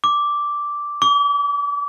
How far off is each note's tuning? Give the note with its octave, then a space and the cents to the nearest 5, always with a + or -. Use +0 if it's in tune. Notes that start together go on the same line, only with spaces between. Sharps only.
D6 -5
D6 -35